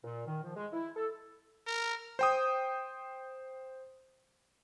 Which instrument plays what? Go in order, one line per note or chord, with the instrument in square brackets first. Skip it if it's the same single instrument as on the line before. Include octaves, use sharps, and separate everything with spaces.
[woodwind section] A#2
D#3
F3
G#3
E4
A4
[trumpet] A#4
[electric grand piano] C5 G5 D#6